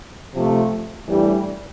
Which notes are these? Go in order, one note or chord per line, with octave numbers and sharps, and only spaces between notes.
C3 F3 A3
A2 E3 G3 D4 G4